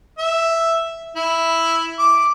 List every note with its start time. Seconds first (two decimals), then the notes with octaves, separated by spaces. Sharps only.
0.18 E5
1.16 E4
1.99 D6